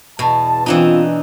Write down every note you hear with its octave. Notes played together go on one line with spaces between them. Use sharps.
E2 B2 A5
E3 C4 D4 D#4 F4